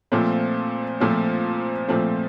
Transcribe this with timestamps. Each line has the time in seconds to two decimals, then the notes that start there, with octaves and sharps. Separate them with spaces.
0.12 A#2 F3 A3 C4
1.00 A#2 F3 A3 C4
1.88 A#2 F3 A3 C4